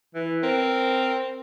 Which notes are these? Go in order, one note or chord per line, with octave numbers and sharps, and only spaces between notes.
E3
C4 A#4